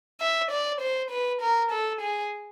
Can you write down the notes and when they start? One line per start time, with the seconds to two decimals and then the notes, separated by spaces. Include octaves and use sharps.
0.21 E5
0.51 D5
0.81 C5
1.11 B4
1.42 A#4
1.71 A4
2.01 G#4